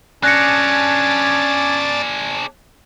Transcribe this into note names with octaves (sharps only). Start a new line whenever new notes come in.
C#4 D4 G#4 D5 A5 F#6 A#6 C#7